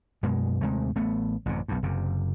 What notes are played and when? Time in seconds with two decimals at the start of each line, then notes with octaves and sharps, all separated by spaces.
0.23 F#2 B2 G#3
0.61 D#2 C3 G#3 A3
0.96 A1 A3 B3
1.46 A1 F#2 C3
1.68 B1 G2
1.83 F#1 F#2 C3